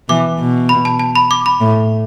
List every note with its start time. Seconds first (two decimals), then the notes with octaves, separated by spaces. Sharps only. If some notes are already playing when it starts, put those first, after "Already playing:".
0.08 B2 E3 D6
0.39 B2
0.69 B5
0.85 A5
0.99 A5
1.16 B5
1.31 D6
1.46 B5
1.60 A2